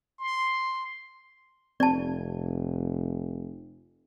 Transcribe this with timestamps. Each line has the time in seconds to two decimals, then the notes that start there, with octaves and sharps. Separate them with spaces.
0.19 C6
1.80 F1 C4 D5 A5